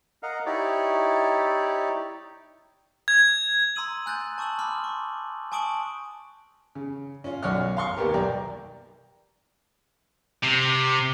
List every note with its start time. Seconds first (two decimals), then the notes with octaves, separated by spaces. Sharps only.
0.23 A#4 D#5 F5 F#5
0.46 D#4 E4 G4 C#5 D5
3.08 G#6
3.76 A#5 C6 D#6 E6 D#7 F#7
4.06 G#5 F#6 G6 A6
4.38 A5 C#6 D#6 E6 F#7
4.59 B5 C6 D6 F6 F#7
4.84 C#6
5.52 G#5 A5 C#6 D#6 D7 F#7
6.75 C#3
7.24 C#4 F4
7.43 B1 F#2 C#5 D5 F#5 F6
7.77 F5 C6 C#6
7.97 D#2 A#3 B3 G4 A#4
8.14 B1 D5 G5 A#5
10.43 C3